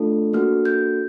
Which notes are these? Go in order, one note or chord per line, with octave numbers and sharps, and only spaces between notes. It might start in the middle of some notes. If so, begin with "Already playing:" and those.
Already playing: A3 D4 F4 A4
A#3 D4 F#4 A4 F6
G6